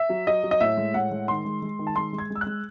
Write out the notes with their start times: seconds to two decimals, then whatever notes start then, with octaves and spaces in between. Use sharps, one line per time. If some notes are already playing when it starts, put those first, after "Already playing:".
Already playing: E5
0.09 F#3
0.27 F#3 D#5
0.44 F#3
0.51 D#5
0.60 A2 E5
0.77 G#3
0.94 A2 F#5
1.11 G#3
1.28 D#3 C6
1.45 G#3
1.62 G#3
1.79 D#3
1.87 A5
1.96 G#3 C6
2.13 G#3
2.18 G#6
2.30 G#3
2.35 E6
2.41 F#6
2.46 G#3